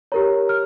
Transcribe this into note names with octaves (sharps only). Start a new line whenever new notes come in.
G4 A#4 C#5 A#5
F6